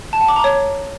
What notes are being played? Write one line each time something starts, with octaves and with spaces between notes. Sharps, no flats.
A5
F#5
D6
A#5
C#5